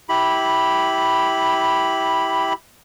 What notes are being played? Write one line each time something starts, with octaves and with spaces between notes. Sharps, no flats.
E4 G4 B5